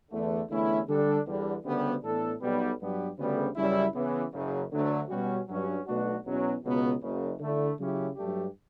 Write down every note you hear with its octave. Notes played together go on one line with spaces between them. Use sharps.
E2 D3 A3
E2 D3 A3 C#4 E4
D3 G3 D4 A4
E2 D3 G3
D2 C#3 G3 B3
A2 E3 B3 D4 A4
B1 B2 G3 B3
G2 F#3 B3 D4 G4
D2 C#3 G3 B3
F#2 C#3 G3 C#4 E4
C#3 E3 B3
F#1 F#2 C#3
D2 D3 F#3 A3
B2 G3 C#4 F#4
G2 F#3 C#4 F#4
B1 B2 A3 D4 F#4
E2 B2 F#3 C#4
C#2 B2 F#3 B3
F#1 F#2 C#3
D3 A3 E4
C#3 F#3 C#4 E4 G4
G2 F#3 A3 D4 G4